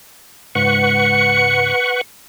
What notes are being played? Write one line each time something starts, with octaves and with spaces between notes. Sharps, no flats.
C#2 G#2 B4 F#5 C#6 C#7